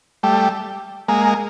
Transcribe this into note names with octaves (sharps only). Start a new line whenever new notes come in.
G3 A3
G#3 A#3